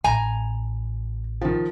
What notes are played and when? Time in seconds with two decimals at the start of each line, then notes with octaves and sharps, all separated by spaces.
0.04 A1 G#5 A#5
1.41 D#3 F3